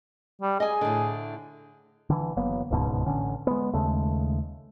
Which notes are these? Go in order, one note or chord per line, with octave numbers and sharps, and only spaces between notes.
G3
G#4 D#5 G#5
A2 D3
D3 E3
F#1 F#3 A#3 B3
D1 C#2 G#2 B2
A1 D3 C#4
G#3 B3
D#2 C#3 G#3 A3